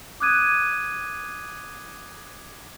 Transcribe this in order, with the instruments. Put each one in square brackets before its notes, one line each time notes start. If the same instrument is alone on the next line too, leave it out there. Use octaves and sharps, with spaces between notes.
[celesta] D6 D#6 F#6 G#6 D#7